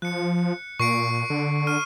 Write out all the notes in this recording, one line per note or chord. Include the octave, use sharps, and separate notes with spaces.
F3 F#6 C#7
A#2 C#6 C7 D7
D3
F6 D#7